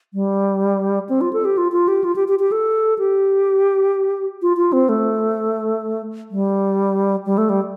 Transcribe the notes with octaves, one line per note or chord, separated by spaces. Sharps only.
G3
C4
F4
A4
G4
F4
F4
G4
F4
G4
G4
G4
A4
G4
F4
F4
C4
A3
G3
G3
A3
G3